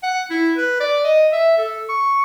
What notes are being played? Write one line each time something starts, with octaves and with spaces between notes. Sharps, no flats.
F#5
E4
B4
D5
D#5
E5
A4
C#6